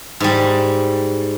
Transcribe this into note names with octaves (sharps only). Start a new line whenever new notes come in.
G#2 G3